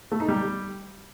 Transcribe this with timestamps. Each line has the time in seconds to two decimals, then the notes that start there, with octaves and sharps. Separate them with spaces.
0.12 A3
0.20 D#4
0.28 G3